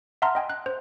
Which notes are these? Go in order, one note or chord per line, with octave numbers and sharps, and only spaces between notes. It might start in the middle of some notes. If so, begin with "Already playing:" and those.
E5 F#5 A5 A#5 C6 F6
D#5 G5 G#5
F#6
C5